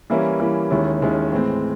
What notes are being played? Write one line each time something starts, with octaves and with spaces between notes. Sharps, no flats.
E3 G3 A#3 C#4 E4
E3 G3 A#3 C#4 E4
D#2 D#3 G#3 C#4 E4
D#2 D#3 G#3 C#4 E4
A2 E3 G#3 C4